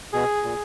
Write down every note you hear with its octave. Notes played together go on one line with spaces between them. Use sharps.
B2 G#4
A#2